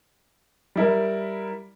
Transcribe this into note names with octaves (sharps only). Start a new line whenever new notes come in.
G3 E4 A#4